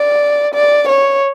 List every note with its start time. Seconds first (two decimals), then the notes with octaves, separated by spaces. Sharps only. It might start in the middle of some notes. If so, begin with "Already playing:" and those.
Already playing: D5
0.54 D5
0.88 C#5